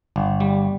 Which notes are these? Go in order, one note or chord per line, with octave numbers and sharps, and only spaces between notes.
G1
G3